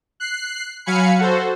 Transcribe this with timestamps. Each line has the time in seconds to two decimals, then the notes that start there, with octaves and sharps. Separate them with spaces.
0.20 F#6 C7
0.86 F#3 F5 G#5 B5 C#7
1.19 F#4 A4 C5